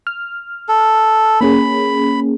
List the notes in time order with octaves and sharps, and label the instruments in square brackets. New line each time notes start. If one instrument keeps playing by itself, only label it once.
[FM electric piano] F6
[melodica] A4
[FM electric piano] A#3 C#4 G#4 [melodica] B5